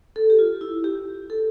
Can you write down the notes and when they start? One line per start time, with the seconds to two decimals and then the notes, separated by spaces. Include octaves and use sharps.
0.16 A4
0.30 G4
0.39 F4
0.61 E4
0.84 G4
1.30 A4